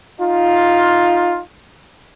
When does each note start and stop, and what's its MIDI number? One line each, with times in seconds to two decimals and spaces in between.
0.20 1.40 63
0.20 1.40 65